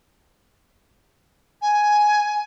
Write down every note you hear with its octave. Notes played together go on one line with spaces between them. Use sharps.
G#5